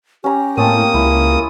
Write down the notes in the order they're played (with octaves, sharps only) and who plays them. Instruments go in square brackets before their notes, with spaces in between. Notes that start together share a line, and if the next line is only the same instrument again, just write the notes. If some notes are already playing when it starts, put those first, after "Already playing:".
[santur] C#4 A#5 [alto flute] G4
[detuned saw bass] A2 [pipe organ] A#3 D#6 [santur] C4 C#4 A5
[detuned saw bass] C#2 [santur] E4